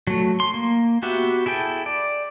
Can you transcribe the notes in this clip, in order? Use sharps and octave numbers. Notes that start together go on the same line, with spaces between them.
F#3 A3
C6
A#3
B3 F#4 G4 E5
E4 G#4 A4 G5
D5